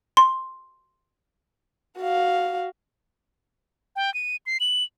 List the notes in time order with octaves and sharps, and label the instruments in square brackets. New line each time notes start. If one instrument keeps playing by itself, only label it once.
[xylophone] C6
[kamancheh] F#4 F5
[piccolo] G5
D#7
C7
F#7